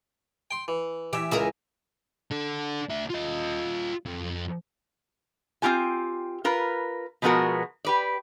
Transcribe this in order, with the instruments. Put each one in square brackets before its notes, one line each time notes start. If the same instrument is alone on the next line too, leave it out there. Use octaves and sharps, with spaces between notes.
[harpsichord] G5 C6
E3
[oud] E3 [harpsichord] G4 E5
[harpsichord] C#2 E5 [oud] E3 G#4 A#4
[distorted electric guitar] D4 A4
D2 E5
F4 D#5
F2
[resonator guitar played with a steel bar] C4 D#4 F4 G4 G#5
F4 A#4 B4
B2 F3 G#3 B3 F#4 A#4
G4 B4 D5